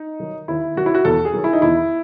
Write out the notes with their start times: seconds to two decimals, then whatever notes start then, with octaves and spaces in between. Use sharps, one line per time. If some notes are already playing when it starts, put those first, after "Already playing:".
Already playing: D#4
0.20 D#3 F#3
0.48 D#2 E4
0.76 D#3 F#3 F#4
0.86 E4
0.95 F#4
1.05 E2 A4
1.25 G#4
1.33 D#3 F#3
1.44 E4
1.53 D#4
1.62 E2 E4